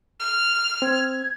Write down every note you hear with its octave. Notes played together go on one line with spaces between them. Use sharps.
F6
C4 G#6